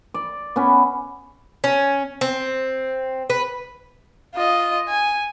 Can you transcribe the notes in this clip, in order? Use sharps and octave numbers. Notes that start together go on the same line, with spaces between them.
D5
B3 C#4
C#4
C4
B4
F4 D#5
G#5